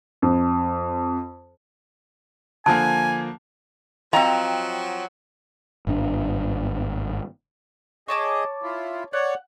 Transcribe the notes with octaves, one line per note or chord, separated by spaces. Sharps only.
F2
D3 F3 A#3 G#5 A5
F3 F#3 C4 D#5 F5 G5 A#5
G#1 G2 C4 D4
G#4 C#5 D#5 A5 D6
E4 F4
C#5 D5 F#5